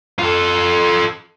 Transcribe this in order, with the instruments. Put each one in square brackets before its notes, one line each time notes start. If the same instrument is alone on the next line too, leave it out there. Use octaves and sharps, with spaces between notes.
[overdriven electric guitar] F4 A4